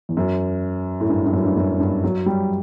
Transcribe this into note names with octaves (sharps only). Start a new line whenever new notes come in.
E2
F#2
A2
G2
G2
F#2
G2
F#2
G2
F#3
G3